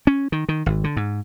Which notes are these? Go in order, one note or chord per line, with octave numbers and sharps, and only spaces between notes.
C#4
D#3
D#3
G#1
D3
G#2